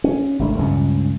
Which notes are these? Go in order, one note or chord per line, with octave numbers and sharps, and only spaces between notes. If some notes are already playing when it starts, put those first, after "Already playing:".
C#4
G#1 C3 A3 D4
C#2 G2 A#2 C#4